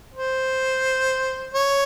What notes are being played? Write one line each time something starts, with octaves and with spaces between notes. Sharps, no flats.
C5
C#5